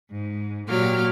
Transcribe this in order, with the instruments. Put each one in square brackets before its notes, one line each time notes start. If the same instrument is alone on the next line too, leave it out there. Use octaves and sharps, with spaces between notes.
[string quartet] G#2
A#2 F#3 G4 F6